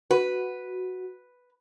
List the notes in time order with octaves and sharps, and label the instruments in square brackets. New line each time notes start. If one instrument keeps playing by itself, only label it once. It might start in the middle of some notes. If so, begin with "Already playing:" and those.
[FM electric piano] F#4 [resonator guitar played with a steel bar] B4